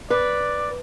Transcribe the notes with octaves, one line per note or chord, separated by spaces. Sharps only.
B4 D5